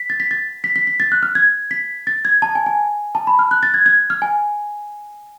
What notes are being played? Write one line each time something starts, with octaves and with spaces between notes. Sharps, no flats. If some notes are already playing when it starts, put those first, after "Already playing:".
Already playing: B6
A6
B6
A6
B6
B6
B6
A6
F#6
F6
G#6
B6
A6
G#6
A5
G#5
G#5
A5
B5
F6
F#6
A6
G#6
G#6
F6
G#5